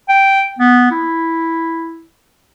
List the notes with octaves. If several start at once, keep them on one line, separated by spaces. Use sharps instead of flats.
G5
B3
E4